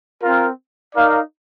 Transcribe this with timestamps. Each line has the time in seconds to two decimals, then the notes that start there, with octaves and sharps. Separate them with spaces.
0.23 C4 F4 A#4
0.95 D#4 A#4 D5 F5